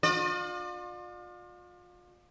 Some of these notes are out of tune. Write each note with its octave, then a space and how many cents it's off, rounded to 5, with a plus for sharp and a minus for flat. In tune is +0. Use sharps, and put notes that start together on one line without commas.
F4 +35 D5 +40